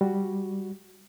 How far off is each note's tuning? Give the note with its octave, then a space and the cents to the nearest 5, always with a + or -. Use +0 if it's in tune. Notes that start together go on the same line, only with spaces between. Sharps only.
G3 +0 F#4 +0